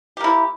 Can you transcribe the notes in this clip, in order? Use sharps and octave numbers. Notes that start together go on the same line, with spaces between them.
A#3 E4 G4